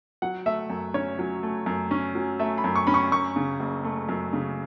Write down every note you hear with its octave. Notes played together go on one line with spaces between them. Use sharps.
F#3 F#5
A3 E5
F#2
C#4 C#5
F#3
A3
F#2
C#4
F#3
A3 E5
B5
F#2
C#6
C#4 B5
C#6
F#2 C#6
C#3
F#1
A3
F#2
C#3